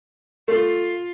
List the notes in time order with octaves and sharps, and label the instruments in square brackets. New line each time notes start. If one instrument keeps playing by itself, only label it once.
[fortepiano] A3 [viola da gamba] F4